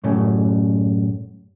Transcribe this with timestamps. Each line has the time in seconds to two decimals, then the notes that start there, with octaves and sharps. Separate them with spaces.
0.04 F#2 A2 C#3